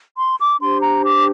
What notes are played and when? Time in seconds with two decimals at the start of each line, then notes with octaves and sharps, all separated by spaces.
0.16 C6
0.38 D6
0.59 D4 G4 C5 C6
0.82 A#5
1.04 D6